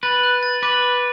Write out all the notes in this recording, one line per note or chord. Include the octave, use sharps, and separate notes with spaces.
B4 A6
F#6
A6
B4 D6
D6